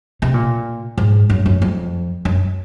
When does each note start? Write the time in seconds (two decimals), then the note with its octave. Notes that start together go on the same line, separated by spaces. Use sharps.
0.22 C3
0.34 A#2
0.98 G#2
1.30 F#2
1.46 F#2
1.62 F2
2.25 F#2